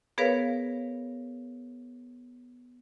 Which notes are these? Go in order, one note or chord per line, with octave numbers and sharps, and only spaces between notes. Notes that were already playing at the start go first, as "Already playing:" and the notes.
B3 G#4 A#4 B4 C#5 F5